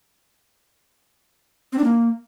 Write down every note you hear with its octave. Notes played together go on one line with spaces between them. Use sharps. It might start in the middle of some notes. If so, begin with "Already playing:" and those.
C4
D4
A#3